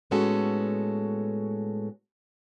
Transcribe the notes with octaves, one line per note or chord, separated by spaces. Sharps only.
A2 G#3 B3 C#4 F#4 A4